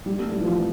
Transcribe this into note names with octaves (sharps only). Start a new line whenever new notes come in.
G3
A3
G3
E3
F3